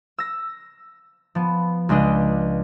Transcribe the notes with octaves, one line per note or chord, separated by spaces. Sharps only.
E6 A#6
F3 B3
C#2 G#3 D4 D#5